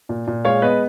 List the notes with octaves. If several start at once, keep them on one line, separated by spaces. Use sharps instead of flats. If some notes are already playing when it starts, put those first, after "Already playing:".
A#2
A#2
G#3 C#5 F5
B3 B4 D#5